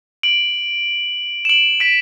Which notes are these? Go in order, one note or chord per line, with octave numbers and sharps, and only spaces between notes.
D7 F#7
E7
D7 F#7
B6 D7